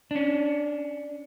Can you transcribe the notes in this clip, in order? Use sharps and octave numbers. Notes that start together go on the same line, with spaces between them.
C#4 D4